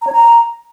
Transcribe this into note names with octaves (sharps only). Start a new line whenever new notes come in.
A#5
C#5
A#5